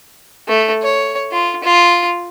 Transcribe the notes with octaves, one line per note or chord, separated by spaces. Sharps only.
A3
C#5
F4
F4